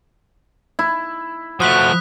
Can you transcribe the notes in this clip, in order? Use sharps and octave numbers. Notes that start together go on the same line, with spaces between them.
E4
F3 A3 F#4 D#6 F#6 B6